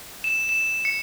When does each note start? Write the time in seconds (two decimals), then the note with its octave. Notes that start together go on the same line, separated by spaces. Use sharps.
0.24 E7
0.49 E7
0.85 C#7